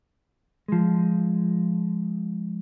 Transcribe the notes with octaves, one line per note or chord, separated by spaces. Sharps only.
F3 G#3